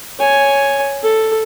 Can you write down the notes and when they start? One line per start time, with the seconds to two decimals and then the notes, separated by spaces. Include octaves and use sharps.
0.19 C#5 G#5
1.03 A4